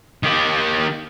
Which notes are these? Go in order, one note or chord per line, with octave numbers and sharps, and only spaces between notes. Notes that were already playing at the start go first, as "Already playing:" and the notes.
D#3 G4